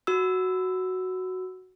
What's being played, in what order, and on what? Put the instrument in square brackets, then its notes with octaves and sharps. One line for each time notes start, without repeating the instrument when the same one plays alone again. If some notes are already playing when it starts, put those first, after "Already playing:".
[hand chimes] F#4 E6